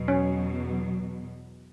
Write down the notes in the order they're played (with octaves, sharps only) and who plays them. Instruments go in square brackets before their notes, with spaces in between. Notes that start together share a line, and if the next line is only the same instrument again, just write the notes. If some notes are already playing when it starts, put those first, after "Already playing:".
Already playing: [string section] E2 B2 F#3
[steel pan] C#4